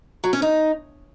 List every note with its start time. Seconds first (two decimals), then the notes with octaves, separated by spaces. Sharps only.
0.24 F#3
0.33 C#4
0.42 D#4